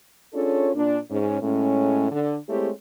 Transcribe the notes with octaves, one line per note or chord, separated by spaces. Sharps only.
C#4 D4 F4 G#4 A4 C#5
A#2 D4
G#2 C#4
A2 G#3 C#4
D3
G#3 A3 C4 E4 G4 C#5